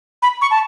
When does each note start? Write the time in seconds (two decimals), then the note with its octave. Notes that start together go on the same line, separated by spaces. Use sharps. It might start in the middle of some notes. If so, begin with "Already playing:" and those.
0.22 B5
0.42 C#6
0.51 A5